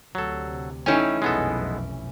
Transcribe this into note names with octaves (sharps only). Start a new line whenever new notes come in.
D2 C3 F#3 A4
E3 A3 C#4 D#4 E4 C#5 G5
F1 B1 F#2 G#3 B3 A4